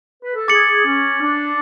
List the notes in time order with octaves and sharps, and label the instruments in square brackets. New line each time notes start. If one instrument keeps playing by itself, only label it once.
[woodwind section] B4
A4
[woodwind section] G#4 [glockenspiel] D6 A6 C#7 F#7
[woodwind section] C#4
D4